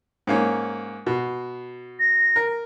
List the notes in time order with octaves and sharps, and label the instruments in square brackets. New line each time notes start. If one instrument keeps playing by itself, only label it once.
[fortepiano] G#2 A#3 C#4
B2
[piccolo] A#6
[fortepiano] A#4